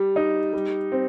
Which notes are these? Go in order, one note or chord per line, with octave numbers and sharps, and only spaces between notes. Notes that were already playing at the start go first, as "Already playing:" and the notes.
Already playing: G3
D#4
G3
C4